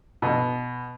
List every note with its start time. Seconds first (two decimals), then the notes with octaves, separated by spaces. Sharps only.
0.22 B2